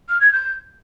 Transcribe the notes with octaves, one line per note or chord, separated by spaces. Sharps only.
F6
G#6
G6